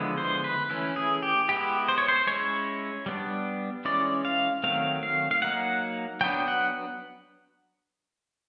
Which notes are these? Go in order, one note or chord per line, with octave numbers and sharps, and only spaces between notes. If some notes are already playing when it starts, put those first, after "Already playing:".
Already playing: D3 F3 G#3 B3 E4
C5
B4
E3 A3 C#4 E4
G#4
G4
G#3 B3 E4 G4
C5
C#5
C5
G#3 C#4 E4 C#5
G3 B3 D4
E3 G#3 C#4 E4 D5
F5
D#3 F#3 A3 C4 F5
F5
F5
F#3 A#3 D#4 F#5
F#3 B3 D4 G5
F#5